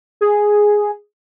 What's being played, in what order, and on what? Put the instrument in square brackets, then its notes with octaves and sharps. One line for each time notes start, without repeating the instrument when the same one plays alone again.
[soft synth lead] G#4